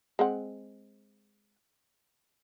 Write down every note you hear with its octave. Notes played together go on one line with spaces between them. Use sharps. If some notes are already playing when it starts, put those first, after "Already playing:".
G#3 C4 F#5